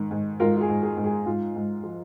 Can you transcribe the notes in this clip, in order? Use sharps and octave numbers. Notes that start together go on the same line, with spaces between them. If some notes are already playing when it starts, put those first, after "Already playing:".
Already playing: G#2 D#3
G#2
G#2 F4 A#4
F4
G#4
G#2
G#4
G#2
G#4
G#2 F4
G#2
F3